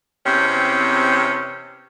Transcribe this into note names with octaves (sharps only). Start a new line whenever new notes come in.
E2 C3 C4 C#4